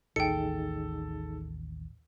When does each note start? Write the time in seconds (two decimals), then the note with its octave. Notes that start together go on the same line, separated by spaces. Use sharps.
0.16 A1 D#2 D#4 G#4 A4 G5 C#7